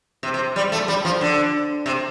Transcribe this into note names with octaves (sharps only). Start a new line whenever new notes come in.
C3
C3
G3
A3
G3
F3
D3
C3